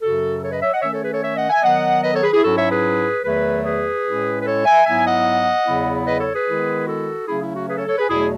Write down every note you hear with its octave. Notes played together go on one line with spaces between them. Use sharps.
F#2 C#3 F#3 F#4 A4
A4 C#5
B4 D#5
C#5 E5
D#5 F#5
D#3 A3 C#4 C#5 E5
A4 C#5
G#4 B4
A4 C#5
C#5 E5
D#5 F#5
E5 G#5
D#3 F#3 B3 D#5 F#5
B4 D#5
A4 C#5
G#4 B4
E4 G#4
G#2 F#3 C#4 E4 F#4 A4
C#5 E5
G#4 B4
E2 D#3 F#3 A3 G#4 B4
G#4 B4
A2 G#3 C#4 E4
B4
A4 C#5
E5 G#5
G#2 F#3 B3 E4 E5 G#5
D#5 F#5
E2 C#3 F#3 B3 E4
B4 D#5
A4 C#5
G#4 B4
D#3 G#3 B3 E4
F#4 A4
C#3 F#3 A3 C#4 E4 G#4
E4
F#4
G#4 B4
A4 C#5
A4 C#5
G#4 B4
E2 B2 F#3 A3 E4 G#4